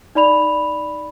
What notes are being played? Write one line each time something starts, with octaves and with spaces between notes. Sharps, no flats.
D#4 D5 B5 F7